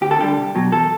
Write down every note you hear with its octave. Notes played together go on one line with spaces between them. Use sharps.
D2 G4
A4
D3 G3 G4
C2
B2 F#3
E2 A4